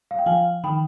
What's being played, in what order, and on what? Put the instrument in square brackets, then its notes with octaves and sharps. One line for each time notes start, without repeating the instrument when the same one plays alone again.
[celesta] F5
G5
[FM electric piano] F3 [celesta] F5 G#5
[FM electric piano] D#3 [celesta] G5 B5